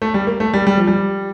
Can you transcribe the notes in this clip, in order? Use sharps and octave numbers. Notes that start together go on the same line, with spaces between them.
A3
G3
A#3
A3
G3
G3
F3
G3